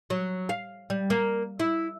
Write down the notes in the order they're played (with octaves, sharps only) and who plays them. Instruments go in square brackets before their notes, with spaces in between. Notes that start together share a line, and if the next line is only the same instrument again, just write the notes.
[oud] F#3
F5
G3
A#3
E4